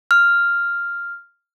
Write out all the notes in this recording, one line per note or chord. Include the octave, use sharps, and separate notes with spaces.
F6